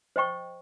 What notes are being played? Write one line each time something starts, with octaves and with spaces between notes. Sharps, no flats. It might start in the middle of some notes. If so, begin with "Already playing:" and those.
C5 D#5 G5 C#6